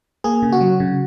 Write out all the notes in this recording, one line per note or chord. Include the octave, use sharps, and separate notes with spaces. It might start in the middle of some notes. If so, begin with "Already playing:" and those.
A#3 G#4
C#3
F#4
F#3
C#3